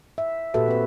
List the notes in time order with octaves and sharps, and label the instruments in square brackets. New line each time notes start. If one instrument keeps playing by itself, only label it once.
[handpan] E5
A#2 F#4 G4 A4 B4 E5
C4 B4